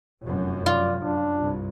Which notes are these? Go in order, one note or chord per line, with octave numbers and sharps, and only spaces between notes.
F1 F#2
F4 D5
F#2 D4
C2 G2